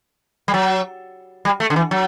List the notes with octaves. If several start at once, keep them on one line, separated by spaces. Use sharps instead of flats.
G3
F#3
G3
A3
D3
E3
F#3